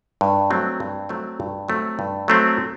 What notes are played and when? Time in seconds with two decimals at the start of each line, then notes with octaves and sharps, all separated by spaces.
0.21 G2
0.50 F#3 A3 C4
0.80 G2
1.09 F#3 A3 C4
1.40 G2
1.68 F#3 A3 C4
1.99 G2
2.28 F#3 A3 C4